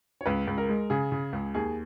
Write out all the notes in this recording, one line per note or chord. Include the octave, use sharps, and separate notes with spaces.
C#5
C#2 B4
C#2
A#4
G#3
C#3 G#4
C#3
C#2
D#2 G#4